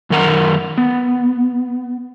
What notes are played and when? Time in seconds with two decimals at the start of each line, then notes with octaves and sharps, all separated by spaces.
0.10 F#2 D#3 A#4 F#5 A#5
0.78 B3